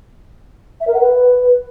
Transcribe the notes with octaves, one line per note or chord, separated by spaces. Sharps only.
E5
A#4
F#5
B4